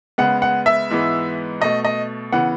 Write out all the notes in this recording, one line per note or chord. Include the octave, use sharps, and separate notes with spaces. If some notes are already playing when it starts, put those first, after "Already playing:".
C#3 G#3 B3 F#5
F#5
E5
G#2 E3 G#3 B3
B2 A3 D#5
D#5
C#3 E3 B3 F#5